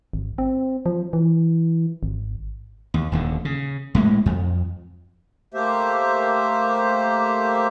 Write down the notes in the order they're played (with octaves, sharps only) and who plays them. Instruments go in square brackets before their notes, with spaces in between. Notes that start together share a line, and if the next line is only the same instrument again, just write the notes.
[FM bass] G#1
C4
F3
E3
G#1
[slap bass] D#2
D#1 D#2 D3
C#3
A2 G#3 A#3
F2
[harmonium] A3 A#3 G4 C5 E5